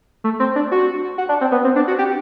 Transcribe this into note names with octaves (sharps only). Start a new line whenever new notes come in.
A3
C4
D4
F#4
F#4
D4
C4
B3
C4
D4
F#4
G4